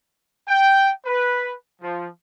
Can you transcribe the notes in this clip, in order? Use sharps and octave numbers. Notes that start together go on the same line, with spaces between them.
G5
B4
F3